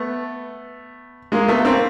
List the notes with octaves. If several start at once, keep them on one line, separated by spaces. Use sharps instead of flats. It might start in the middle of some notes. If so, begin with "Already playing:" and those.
Already playing: A3 B3
G#3 A#3
A3 B3
A#3 C4